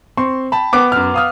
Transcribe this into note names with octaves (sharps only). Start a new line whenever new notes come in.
C4 C6 C#6
G5 A5 B5
B3 D6
F#2 F6
F5 D#6 F6